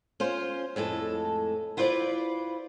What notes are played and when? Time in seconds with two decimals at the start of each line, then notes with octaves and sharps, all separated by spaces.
0.20 C#4 F4 C5
0.76 F2 A2 G#3 A4
1.77 E4 F4 B4 C5 D5